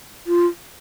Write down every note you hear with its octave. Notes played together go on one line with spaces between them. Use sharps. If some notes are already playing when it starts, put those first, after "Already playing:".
F4